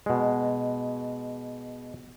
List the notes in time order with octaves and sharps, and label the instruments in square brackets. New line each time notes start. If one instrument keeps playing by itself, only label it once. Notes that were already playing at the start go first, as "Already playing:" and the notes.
[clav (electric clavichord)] B2 G#3